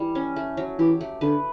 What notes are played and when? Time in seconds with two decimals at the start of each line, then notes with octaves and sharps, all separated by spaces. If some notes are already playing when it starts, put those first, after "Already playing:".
Already playing: E3 G3
0.15 C#4
0.36 A3
0.57 F#3
0.79 E3 G4
1.01 A3
1.21 D3 B4